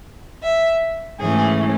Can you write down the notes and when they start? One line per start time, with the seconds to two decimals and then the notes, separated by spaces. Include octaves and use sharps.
0.43 E5
1.19 G#2 E3 A3 C#4 G#4